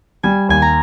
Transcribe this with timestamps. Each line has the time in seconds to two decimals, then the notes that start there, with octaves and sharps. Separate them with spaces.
0.23 G3 G#5
0.49 D#2 G#5
0.62 A#5